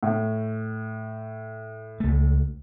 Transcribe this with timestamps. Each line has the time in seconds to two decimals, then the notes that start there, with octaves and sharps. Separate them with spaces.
0.03 A2
2.00 C#2 A3